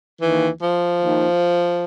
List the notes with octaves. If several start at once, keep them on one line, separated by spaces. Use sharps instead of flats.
D#2 D#3 E3
F3
D#2 D#3